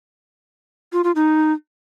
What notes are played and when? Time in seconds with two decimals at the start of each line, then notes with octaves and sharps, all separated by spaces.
0.93 F4
1.04 F4
1.15 D#4